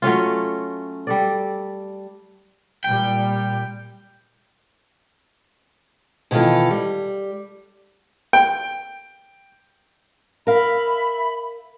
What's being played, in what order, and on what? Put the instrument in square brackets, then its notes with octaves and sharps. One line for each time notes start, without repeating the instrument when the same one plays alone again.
[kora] F#3 A3 C#4 F4
G3 A4 D5
[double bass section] A#2 G3 [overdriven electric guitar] G5
[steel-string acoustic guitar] B2 D#3 E3 F4 A4
G3
[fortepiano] G5
[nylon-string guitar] A#4 F5 [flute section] E5 B5